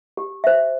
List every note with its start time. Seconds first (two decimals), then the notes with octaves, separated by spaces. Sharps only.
0.17 G4
0.44 C5 E5